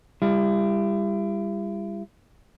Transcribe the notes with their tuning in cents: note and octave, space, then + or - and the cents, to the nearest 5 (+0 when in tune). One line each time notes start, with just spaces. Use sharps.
G3 +30 E4 +40